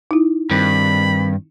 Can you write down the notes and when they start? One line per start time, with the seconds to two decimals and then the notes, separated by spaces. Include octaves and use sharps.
0.11 D#4 E4
0.51 G2 D#3 C4 B5